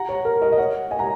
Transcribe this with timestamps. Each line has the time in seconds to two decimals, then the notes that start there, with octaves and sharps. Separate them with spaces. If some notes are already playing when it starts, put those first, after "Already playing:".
Already playing: F#5 A#5
0.09 C#5
0.25 A#4
0.41 A#4 D#5
0.52 D#5
0.58 C#5 F#5
0.91 D#5 G#5
0.99 F#5 A#5